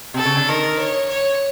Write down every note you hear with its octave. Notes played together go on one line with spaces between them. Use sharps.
C3 A4
C#3
D3
D#3 A#4
C#5
C#5